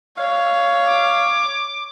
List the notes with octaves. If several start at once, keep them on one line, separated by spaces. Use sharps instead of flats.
C#5 F5
D6